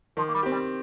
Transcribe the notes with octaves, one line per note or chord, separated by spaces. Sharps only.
D#3 F3
A#3
G3
C4 G4
G3